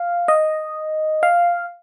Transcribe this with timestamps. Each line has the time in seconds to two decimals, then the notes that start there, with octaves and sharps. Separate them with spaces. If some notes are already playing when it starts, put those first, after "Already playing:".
Already playing: F5
0.28 D#5
1.23 F5